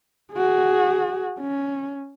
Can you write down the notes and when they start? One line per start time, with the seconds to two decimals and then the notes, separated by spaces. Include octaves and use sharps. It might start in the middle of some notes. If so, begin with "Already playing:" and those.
0.33 F#4 G#4
1.40 C#4